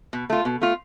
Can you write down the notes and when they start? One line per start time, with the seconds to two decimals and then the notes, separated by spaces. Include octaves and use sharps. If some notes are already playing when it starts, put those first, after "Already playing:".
0.13 B2
0.30 A3 F4
0.45 B2
0.62 A3 F4